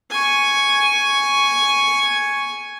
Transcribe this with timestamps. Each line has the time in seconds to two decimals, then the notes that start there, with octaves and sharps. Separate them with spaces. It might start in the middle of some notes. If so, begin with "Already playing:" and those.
0.11 G#5 C#6